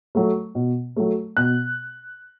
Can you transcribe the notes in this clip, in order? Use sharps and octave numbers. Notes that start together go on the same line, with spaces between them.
F#3 A3
B2
F#3 A3
B2 F#6